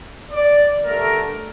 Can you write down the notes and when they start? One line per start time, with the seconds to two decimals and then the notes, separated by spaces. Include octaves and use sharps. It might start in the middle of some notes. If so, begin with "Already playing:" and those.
0.31 D5
0.83 G2 D3 A3 A#4